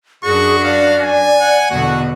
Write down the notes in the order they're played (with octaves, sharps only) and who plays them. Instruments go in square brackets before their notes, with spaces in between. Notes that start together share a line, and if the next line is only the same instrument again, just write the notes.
[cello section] F#2 D4 [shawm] F#4 [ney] G#4 [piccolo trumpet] C#6
[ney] D5 [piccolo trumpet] F5
[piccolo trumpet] G#5
[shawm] F#5
[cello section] E2 B2 D3 [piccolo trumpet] F#4